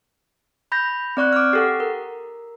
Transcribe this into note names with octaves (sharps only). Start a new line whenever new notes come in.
B5 G6 A#6
C4 D5 C#6 F#6
D6 F6
G4 A4 F#5
A#4